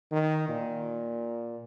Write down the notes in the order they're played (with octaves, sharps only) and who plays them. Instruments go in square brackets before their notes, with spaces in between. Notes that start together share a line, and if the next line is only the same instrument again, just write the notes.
[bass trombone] D#3
A#2